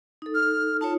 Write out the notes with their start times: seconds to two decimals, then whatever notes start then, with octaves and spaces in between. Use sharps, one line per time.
0.22 D#4 A4
0.35 F6
0.81 D#4 F4 C#5 A5